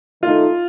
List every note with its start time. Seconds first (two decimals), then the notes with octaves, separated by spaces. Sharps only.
0.22 D#3 A3 D#4 F4 A4